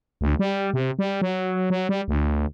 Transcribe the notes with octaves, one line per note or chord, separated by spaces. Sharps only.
D2
G3
C3
G3
F#3
F#3
G3
D2